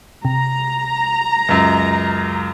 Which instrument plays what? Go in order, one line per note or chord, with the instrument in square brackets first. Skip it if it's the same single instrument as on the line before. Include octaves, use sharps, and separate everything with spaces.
[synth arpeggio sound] C3 [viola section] A#5
[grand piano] C#2 F#2